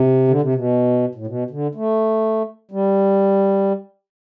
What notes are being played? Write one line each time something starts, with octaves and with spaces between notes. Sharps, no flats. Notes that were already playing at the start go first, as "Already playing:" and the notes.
Already playing: C3
D3
C3
B2
A2
B2
D3
A3
G3